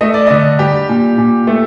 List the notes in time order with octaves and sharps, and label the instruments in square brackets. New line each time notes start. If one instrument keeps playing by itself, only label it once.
[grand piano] A3 D#5
D5
D3 D#5
G3 G4
A#2
A#2
A3